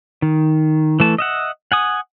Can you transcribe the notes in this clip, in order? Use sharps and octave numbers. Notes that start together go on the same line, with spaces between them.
D#3
E3 A3 A5
D#5 E5 F#5
F#5 G#5 D#6